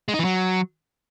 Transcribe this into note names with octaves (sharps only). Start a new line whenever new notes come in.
G#3
D#4
E3
F#3